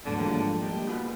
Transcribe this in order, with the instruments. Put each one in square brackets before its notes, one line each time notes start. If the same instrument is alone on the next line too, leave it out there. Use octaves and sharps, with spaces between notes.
[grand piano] D2 G#2 [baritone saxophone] D3 [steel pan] F#3 B3
[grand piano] F3 G#3 F4 [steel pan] G3 A#3 G4
[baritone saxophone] G3 [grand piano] A#3 [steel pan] D#4
[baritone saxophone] B2 [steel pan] G#3 F4 B4